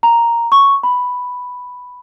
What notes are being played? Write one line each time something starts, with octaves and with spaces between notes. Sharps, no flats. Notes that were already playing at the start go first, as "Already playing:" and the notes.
A#5
C#6
B5